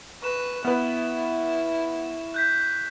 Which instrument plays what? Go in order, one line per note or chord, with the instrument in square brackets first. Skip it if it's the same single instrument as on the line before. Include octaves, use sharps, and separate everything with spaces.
[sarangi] B4 [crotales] C#6 E7
[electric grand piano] B3 B4 [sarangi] E4 [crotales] F6
[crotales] F#6 G6 B6